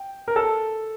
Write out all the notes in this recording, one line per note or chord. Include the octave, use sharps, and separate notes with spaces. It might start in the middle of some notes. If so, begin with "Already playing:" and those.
Already playing: G5
A#4
A4